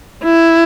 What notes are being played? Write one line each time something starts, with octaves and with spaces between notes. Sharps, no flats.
E4